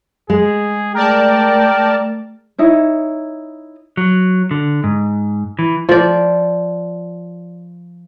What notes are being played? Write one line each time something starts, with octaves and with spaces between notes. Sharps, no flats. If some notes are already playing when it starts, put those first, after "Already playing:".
G#3 G#4
A3 A#4 D5 G5 A5
D#4 E4 C#5
F#3
D3
G#2
E3
F3 D5